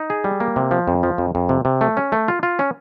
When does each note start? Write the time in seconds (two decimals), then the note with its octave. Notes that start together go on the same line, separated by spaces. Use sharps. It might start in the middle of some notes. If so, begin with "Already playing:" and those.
Already playing: D#4
0.10 G#4
0.24 G3
0.40 A#3
0.56 C3
0.71 F3
0.88 F2
1.03 F3
1.18 F2
1.35 F2
1.49 C3
1.65 C3
1.81 A3
1.97 C#4
2.12 A3
2.28 F4
2.43 F4
2.59 C#4